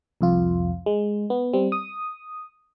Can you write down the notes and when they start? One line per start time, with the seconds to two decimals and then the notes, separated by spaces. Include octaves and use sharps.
0.21 C2 F2 F4
0.86 G#3
1.30 B3
1.53 G3 C4
1.72 D#6